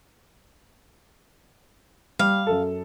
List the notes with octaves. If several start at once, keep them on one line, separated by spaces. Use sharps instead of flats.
G3 F5
F#2 A4